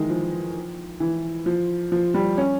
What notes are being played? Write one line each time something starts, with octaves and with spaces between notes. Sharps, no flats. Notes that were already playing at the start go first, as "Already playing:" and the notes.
Already playing: D#3 E3 G#3
F3
E3
F3
F3
G3
C#4